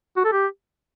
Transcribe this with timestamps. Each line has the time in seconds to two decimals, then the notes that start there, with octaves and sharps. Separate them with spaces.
0.17 F#4
0.25 A4
0.32 G4